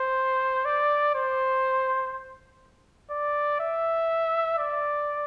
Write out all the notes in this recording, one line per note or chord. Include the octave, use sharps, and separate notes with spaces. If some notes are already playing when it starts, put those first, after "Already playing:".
Already playing: C5
D5
C5
D5
E5
D5